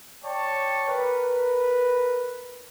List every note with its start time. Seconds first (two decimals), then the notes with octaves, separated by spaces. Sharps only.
0.24 C#5 D5 G5 A5 C#6
0.88 A#4 B4